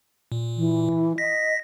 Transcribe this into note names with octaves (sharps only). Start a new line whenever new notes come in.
A#2
E3
D#5 A#6 B6